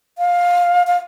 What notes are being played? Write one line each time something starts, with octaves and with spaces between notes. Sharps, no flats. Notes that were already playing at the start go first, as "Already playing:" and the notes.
F5
F5